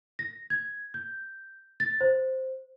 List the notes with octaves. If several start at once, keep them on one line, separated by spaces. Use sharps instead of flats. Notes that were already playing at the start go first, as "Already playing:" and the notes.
A#6
G#6
G6
A6
C5